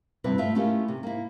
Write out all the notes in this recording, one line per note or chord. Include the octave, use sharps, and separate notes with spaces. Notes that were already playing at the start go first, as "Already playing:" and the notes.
G2 C3 E4 B4
A3 F4 E5
A3 C#4 E4 F4 G4 A#4
C3
A#3 E4